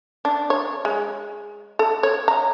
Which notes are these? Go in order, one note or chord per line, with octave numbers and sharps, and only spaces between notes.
D4
C#5
G#3
A4
C#5
A#5